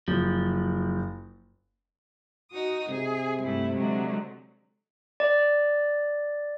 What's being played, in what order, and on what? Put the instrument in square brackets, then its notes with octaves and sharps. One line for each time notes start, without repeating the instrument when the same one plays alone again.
[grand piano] F#1 [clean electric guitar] F3
[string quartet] D#4 F#4 D#6
[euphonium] C3 [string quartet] G#4
[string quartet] G2 A3 E4
D3 F#3 G#3
[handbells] D5